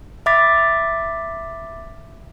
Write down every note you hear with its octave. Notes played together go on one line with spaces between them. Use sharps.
E5 B5 D6 A6 B6